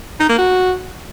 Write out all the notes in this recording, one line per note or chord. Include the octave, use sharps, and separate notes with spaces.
D#4
A#3
F#4